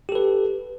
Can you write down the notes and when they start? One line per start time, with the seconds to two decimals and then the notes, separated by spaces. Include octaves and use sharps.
0.09 G4
0.12 A4
0.15 B4